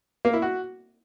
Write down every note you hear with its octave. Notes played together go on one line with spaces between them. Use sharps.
A#3
E4
F#4